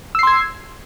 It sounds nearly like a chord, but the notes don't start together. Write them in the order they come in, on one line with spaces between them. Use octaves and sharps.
E6 C7 C6 G#6